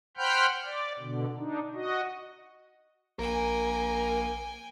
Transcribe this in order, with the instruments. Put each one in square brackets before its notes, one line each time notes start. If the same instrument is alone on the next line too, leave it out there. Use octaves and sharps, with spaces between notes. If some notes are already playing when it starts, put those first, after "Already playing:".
[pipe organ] C5 F#5 G5 B5 F6 G6
D5
B2 D3
D4 D#4
F#4 D#5
[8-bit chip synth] A#1 A#3 [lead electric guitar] A#4 [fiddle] G5 G#5